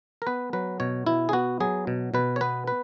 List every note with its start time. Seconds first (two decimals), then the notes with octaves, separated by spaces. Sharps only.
0.22 A#4
0.27 B3 B4
0.53 F#3 B4
0.80 B2 C#5
1.07 B2 E4
1.29 G#4
1.33 B3 F#4
1.60 F#3 G#4
1.87 B2
2.14 B2 B4
2.36 C#5
2.41 B3 B4
2.67 B4